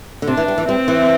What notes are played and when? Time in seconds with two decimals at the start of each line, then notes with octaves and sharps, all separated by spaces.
0.22 D3
0.27 C3 D4
0.37 E3
0.48 G3
0.58 E3
0.68 G3 C4
0.88 E3